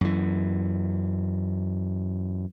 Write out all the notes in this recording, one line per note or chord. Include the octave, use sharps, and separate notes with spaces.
F#2 E3